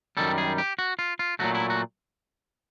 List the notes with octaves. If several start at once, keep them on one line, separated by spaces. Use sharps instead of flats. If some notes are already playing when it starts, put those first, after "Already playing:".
F#2 D#3 G3 A4
G#4
G4
F#4
F4
F4
A#2 F#3 A3 F#4
E4
F#4